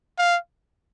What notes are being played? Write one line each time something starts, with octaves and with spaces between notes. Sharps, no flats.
F5